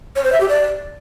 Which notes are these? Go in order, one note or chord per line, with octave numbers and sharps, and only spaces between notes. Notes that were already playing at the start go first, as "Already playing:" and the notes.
C#5
C5
E5
G4
D5